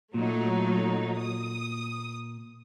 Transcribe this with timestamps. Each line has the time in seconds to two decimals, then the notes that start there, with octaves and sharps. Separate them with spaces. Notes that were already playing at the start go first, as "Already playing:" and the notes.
0.14 A#2 F#3 A3 D#4
1.19 D#6